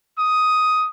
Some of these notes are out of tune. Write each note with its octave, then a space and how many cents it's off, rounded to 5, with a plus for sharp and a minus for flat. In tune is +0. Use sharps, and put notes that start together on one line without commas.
D#6 +5